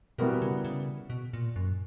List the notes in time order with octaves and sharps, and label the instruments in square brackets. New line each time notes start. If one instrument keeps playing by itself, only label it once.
[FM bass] B2 [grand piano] E3 G3 B3 F#4 A#4
[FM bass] C#3
C#3
B2
A#2
F#2